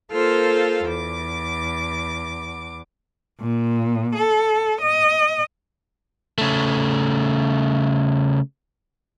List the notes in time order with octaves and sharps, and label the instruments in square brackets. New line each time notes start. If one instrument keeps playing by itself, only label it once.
[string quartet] A#3 F4 A4 C5 F5
E2 D6
[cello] A#2
A4
D#5
[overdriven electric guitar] C#3 A3